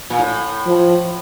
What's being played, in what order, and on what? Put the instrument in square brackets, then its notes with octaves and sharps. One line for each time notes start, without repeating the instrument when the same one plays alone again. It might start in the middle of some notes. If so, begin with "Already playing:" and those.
[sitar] A#2
A2
[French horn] F3